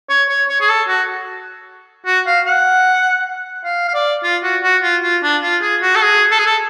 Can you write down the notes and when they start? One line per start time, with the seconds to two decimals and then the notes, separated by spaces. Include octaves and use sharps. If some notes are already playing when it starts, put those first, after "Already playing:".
0.09 C#5
0.29 C#5
0.49 C#5
0.61 G#4
0.69 A4
0.88 F#4
2.06 F#4
2.27 F5
2.46 F#5
3.65 F5
3.88 F5
3.94 D5
4.23 F4
4.43 F#4
4.63 F#4
4.83 F4
5.03 F4
5.23 D4
5.42 F4
5.62 G#4
5.82 F#4
5.96 A4
6.02 G#4
6.31 A4
6.38 G#4
6.46 A4